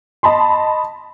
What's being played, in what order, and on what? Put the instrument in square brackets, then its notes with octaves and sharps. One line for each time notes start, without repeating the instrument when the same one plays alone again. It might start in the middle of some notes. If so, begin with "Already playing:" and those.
[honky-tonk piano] D#5 A5 B5 C6